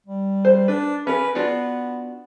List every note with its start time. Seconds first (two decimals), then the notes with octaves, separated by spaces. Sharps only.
0.07 G3
0.45 C5
0.68 D4 B4
1.07 C#4 A#4 B4
1.35 B3 D4 F4 F#4